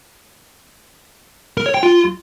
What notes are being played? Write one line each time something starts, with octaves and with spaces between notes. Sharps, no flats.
A#4
C#5
G5
F4